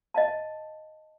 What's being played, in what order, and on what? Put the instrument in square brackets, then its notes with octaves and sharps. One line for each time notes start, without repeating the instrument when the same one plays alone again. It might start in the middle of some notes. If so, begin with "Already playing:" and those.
[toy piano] D#5 F5 A5